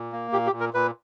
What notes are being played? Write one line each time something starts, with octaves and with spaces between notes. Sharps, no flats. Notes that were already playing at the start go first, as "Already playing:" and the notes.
Already playing: A#2
A#3
A#2 G4
G4
A#2
A#4
A#2 B4